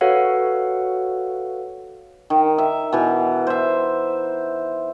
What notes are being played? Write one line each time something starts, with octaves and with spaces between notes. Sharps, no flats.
F#4 A4 B4 C#5 F5 F#5
D#3
E5
B2 E3
C5 E5